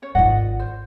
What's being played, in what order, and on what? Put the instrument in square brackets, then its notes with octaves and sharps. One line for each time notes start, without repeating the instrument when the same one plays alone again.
[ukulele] C#4 C#5
[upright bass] G#1 F4 [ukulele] D5 D#5 F#5
[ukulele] C5